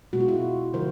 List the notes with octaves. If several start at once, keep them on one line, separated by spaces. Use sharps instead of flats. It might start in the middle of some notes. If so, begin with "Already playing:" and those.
B2 G#3 F#4
F4
E4 F#4
D3 F3 G#3 A#4 C5